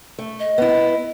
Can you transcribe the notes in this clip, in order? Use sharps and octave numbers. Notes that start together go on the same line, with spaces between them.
A3
D#5
B3 E4